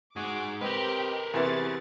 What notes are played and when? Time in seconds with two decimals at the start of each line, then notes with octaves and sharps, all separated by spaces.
0.16 G#2 G#3 F#4 G#4 G#5 D6
0.61 C4 G4 A#4 B4 D#5 F6
1.34 E2 C3 E3 G#5 C6 C#6 A6